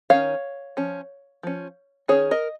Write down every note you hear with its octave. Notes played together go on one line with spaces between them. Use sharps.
D#3 C#4 C#5 F5
F3 C#4
F3 C#4
D#3 C#4 G#4 C#5
A#4 D#5